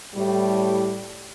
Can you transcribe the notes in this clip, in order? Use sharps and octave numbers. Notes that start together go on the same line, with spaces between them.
A2 G3